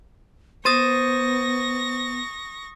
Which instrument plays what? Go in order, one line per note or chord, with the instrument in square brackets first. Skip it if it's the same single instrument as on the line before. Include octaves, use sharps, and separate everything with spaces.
[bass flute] B3 [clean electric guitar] C5 [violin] C#6 A#6 [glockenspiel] D#6 A6 D#7